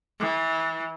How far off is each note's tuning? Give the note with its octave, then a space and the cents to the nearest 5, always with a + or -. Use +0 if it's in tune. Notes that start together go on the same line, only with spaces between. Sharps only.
E3 -25